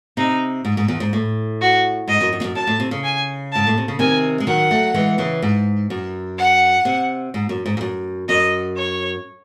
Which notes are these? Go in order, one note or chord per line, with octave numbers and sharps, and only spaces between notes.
C3 D#4
G#2
G#2
E2
G#2
A2
F#4
G#2 D#5
F#2
F#2
E2
F#2
F#2 A5
A2
C3
C#3
G#5
G#2 A5
A2
C3
C#3
C3 D#3 G#5
G#3
D#3 F#3 F#5
F#3 A3
E3 G#3
C#3 E3
G#2
F#2
F#5
C3
G#2
F#2
G#2
G#2
F#2
F#2 D#5
C#5